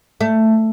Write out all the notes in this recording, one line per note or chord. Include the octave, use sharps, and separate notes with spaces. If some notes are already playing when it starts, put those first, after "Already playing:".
A3